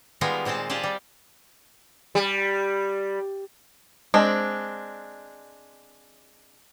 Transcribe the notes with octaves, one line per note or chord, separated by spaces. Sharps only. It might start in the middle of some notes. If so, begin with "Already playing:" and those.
D#3 G3 G#3 B3 F4 A#4
A#2 G#3 C4 D#5 A5
F4 G4 G#4 D5 A5
G3
G3
G#3 C4 D4